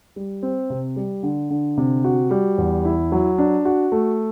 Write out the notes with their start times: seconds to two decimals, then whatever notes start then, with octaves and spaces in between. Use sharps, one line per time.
0.16 G3
0.43 C4
0.70 C3
0.96 G3
1.23 D3
1.50 D3
1.77 C3
2.04 F#4
2.31 G3
2.58 E2
2.85 E4
3.12 F#3
3.38 D4
3.65 F#4
3.92 A3